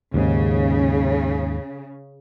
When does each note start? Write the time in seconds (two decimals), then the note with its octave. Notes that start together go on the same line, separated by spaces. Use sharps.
0.14 D#2 G#2 C#3